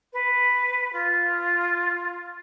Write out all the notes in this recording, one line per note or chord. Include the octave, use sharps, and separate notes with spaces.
B4
F4